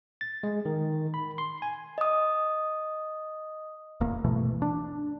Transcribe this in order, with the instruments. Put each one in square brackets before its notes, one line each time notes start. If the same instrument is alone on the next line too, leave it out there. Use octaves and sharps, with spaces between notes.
[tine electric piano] A6
G#3
D#3
B5
C6
G#5
[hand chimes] D#5 D#6
[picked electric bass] D1 E2 A#3
G2 B2 E3 A3
D4